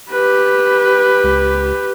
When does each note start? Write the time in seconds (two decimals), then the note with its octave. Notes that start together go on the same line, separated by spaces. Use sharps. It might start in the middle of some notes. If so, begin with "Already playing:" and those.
0.11 G4 B4
1.24 C#2